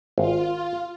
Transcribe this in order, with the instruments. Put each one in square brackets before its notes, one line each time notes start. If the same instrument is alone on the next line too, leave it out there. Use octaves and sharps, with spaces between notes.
[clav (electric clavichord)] G#1 [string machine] F4